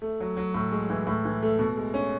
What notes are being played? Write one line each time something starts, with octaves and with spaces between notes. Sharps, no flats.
A3
F#3
F#3
A2
G#3
E3
A2
E3
A3
B2
G#3
C#4